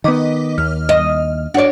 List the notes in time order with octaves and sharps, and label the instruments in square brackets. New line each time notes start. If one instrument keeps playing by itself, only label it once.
[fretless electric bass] D#3 B3 [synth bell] D#5 D6 B6
[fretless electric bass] D#2 [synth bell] F6
[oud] D#5
[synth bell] D4 C#5 [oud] F#4 D5